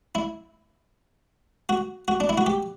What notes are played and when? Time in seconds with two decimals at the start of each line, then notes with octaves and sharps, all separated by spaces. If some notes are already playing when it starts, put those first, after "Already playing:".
0.15 E4
1.69 F#4
2.08 F#4
2.20 D4
2.29 E4
2.38 F#4
2.46 G4